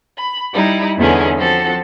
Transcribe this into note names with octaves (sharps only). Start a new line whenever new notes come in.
B5
G3 D#4 E4
E2 D3 B3 C#4 D#4 G#4
F3 C4 F#4 A4